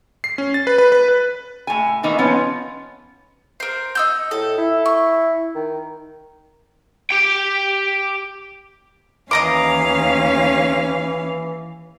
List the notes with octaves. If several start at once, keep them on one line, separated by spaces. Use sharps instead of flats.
C7
C#4
A6
B4
B4
B4
B4
A2 G#5
D#3 E3 A#3 D#4
F3 B3 C#4
A#4 C5
D#4 E6 G6
A2 A4
E4
C#6
D#3
G4 G5
D#2 E3 C#4 D#5 F5 A#5 D6